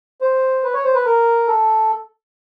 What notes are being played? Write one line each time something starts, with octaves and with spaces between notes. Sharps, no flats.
C5
B4
C#5
C5
B4
A#4
A4